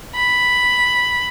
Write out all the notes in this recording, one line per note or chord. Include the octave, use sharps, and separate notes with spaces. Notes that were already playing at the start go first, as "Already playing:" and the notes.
B5